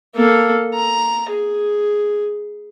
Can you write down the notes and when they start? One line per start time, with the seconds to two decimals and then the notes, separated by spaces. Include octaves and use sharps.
0.15 A#3 A4
0.74 A#5
1.30 G#4